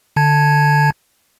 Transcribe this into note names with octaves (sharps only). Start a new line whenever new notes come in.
D3 A5 G#6